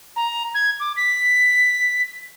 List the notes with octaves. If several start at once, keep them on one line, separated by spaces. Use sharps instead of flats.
A#5
G#6
D6
B6